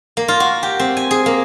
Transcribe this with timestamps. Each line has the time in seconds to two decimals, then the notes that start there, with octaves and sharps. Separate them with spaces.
0.17 A#3
0.28 F4
0.40 F#4
0.63 G4
0.79 C4
0.97 G#5
1.11 G#4
1.26 A#3